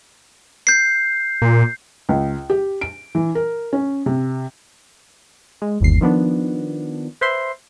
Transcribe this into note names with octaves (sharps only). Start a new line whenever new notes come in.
G6 C7
A#2
C#2
G4
D7
E3
A#4
C#4
C3
G#3
G1 D#2 C7
D#3 F3 B3 D4
B4 C5 E5 C6